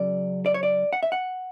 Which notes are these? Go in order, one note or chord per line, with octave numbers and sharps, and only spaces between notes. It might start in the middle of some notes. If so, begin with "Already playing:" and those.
Already playing: C#3 F#3 D5
D5
C#5
D5
F#5
E5
F#5